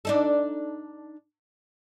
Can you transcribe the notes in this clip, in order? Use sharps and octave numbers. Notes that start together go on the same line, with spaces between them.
D4 D#4 A4